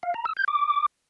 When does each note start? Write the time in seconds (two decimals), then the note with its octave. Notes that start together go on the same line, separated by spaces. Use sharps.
0.03 F5
0.14 A#5
0.25 E6
0.37 G6
0.48 D6